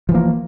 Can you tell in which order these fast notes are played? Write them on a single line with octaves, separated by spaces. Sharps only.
F3 E3 A#3